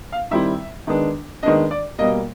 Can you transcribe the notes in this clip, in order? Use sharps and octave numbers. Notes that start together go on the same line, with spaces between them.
F5
D#3 G3 C4 E4 E5
D#3 G#3 B3 D4
D#3 G#3 B3 D4 D#5
D5
B2 G3 A#3 D#5